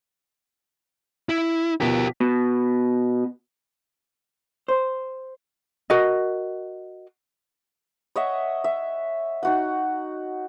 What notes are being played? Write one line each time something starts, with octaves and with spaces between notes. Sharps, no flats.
E4
B2 F3 G4 A#4 B6
B2
C5
F#4 A#4 D#5
C#5 D#5 E5 F#5
E5
D#4 F#4 F#5